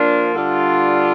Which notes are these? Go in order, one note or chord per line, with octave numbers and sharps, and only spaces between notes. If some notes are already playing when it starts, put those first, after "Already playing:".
Already playing: F3 A#3 D4 F4
D3 G3 D4 F4